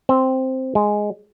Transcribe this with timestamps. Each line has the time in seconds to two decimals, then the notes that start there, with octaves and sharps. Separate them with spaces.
0.09 C4
0.75 G#3